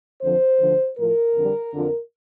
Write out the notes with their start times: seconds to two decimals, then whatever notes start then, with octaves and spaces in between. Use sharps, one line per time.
0.22 F2 D3 F3 C5
0.59 D2 D3 F3
0.97 A2 F3 A#4
1.35 F2 D3 G3
1.73 F2 D3 F3